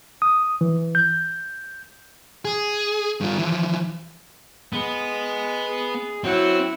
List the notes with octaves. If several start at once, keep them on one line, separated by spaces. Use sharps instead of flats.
D#6
E3
G6
G#4
G2 F4
E3 F3
G#3 B3
G#4
F#3 C4 E4 F#5